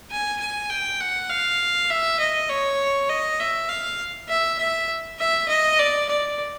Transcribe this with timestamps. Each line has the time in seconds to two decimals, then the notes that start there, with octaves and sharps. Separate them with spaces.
0.11 G#5
0.40 G#5
0.70 G5
1.01 F#5
1.30 F5
1.90 E5
2.19 D#5
2.49 C#5
3.09 D#5
3.40 E5
3.69 F5
4.29 E5
4.59 E5
5.19 E5
5.48 D#5
5.79 D5
6.09 D5